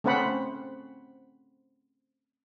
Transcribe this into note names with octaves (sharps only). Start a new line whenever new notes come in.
A3 C4 C#4 C5 F#5 B5